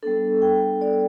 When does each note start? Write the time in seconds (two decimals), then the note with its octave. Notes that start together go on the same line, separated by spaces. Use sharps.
0.03 G3 B3 D4 A4
0.42 G5
0.81 D5